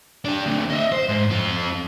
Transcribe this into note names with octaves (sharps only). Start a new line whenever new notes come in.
D4 G4
D2 A#2
D#5 E5
C5
G#2
F2 F4